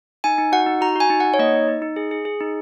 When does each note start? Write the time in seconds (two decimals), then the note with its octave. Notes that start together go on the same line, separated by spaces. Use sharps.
0.24 D#4 G#5
0.38 D#4
0.52 F#4 F#5
0.66 D#4
0.81 F#4 A#5
0.96 F#4 G#5
1.10 D#4
1.20 D#4 F#5
1.34 C#5
1.39 A#3 D#5
1.54 D#4
1.68 D#4
1.82 D#4
1.96 G#4
2.11 G#4
2.25 G#4
2.40 D#4